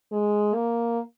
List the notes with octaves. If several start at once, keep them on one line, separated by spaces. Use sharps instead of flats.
G#3
A#3